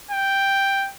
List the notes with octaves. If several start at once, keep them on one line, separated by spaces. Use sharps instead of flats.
G5